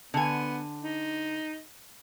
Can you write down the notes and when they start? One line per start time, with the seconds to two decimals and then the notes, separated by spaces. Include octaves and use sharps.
0.14 D3 B3 G#5
0.84 D#4